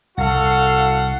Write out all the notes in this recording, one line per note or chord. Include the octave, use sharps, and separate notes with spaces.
C2 F#4 A4 F5 F#5